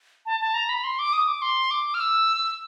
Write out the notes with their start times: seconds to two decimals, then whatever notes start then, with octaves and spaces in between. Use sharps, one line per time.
0.26 A5
0.40 A5
0.54 A#5
0.69 B5
0.84 C6
0.99 D6
1.13 D#6
1.27 D6
1.42 C6
1.71 D6
1.94 F6
2.00 E6